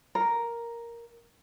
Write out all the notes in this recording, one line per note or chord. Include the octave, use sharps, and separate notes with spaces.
A#4